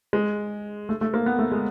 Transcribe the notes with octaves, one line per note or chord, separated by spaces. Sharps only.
G#3
A3
A3
A#3
B3
A3
G#3